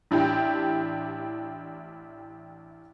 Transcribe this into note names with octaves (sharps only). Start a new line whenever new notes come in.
A1 D4 E4 G4 G5